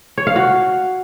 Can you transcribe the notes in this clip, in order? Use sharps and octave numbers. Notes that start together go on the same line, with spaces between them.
C#5
F5
F#4